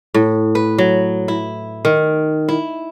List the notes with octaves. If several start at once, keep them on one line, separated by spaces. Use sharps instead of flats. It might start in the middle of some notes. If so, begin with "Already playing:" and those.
A2
B4
F#3
E4
D#3
E4